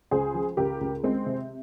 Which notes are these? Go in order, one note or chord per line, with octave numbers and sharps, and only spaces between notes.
C#2 G#4 C5
F3
C#2 G4 A#4
C#2
G#3 C4
C3